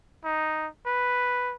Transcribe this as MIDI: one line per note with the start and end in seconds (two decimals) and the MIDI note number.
0.24 0.67 63
0.86 1.54 71